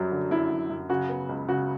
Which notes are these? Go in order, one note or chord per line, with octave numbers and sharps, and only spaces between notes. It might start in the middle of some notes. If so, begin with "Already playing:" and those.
Already playing: F#2 F#3 G3
D3
F#2 E4
F#2
F#2
C#3 F#4
B3
C#2
C#3 F#4